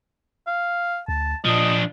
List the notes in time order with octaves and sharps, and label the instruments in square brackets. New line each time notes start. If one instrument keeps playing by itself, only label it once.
[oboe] F5
[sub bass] D2 [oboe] A5
[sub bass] A#2 [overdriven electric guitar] F3 D4 [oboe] D#5